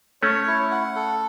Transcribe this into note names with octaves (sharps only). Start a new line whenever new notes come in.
A3 C#4 C#5
E4
F#5
A4